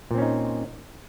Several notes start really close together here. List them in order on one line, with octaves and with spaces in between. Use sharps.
A#2 C4 C#4 D#4